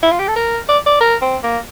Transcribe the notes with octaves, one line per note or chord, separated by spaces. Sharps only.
E4
F4
G4
A4
A#4
D5
D5
A#4
C4
A#3